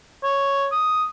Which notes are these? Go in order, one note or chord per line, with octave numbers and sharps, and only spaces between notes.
C#5
D#6